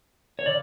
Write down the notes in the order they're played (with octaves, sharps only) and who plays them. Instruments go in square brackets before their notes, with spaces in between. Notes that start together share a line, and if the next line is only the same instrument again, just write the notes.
[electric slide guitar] C#5
C#3 D5